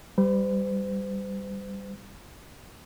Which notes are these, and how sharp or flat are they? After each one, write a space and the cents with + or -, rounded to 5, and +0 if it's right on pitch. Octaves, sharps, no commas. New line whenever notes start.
G3 +0 C5 -45